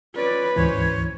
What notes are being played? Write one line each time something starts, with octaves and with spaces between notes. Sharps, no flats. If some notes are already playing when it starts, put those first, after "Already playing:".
C#4 F4 B4 D5
D2 G#2 E3 C#4 C5 C#5